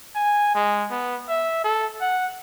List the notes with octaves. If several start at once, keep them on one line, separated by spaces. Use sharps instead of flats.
G#5
G#3
B3
E5
A4
F#5